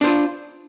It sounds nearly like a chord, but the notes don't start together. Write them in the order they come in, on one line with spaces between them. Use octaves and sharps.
D4 C5 F4